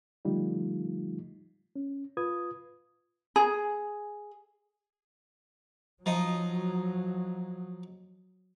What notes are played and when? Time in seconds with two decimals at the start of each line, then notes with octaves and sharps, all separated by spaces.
0.25 D3 F3 G3 A3 D#4 F4
1.76 C#4
2.17 F4 B4 D#6 G#6
3.36 G#4
6.06 F3 F#3 D#4